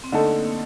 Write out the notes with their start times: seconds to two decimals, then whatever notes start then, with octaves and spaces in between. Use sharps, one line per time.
0.04 C4
0.12 D3 A3 A#3 D#4 A4